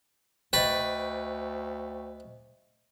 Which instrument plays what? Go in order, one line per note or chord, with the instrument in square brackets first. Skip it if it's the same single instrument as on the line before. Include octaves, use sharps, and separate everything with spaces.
[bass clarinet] D2 [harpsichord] B4 [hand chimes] C5 D#5 [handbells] G5 C#6 A6